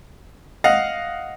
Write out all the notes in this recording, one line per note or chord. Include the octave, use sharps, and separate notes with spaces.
D#5 F5 F#5